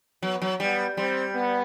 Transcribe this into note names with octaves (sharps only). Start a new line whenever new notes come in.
F#3 B3
F#3
G3 B3
G3 C4
B3